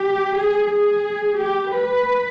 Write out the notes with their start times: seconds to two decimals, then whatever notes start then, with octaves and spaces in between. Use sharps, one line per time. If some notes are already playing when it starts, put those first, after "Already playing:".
Already playing: G4
0.35 G#4
0.70 G#4
1.39 G4
1.73 B4